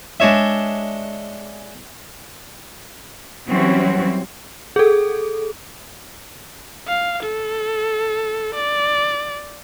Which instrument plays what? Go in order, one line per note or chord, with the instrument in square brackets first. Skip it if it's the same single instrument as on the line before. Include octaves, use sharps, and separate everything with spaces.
[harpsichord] G#3 D4 C#5 E5
[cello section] E3 F#3 G3 C4 C#4 F#4
[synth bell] G#4 A4
[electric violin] F5
A4
D5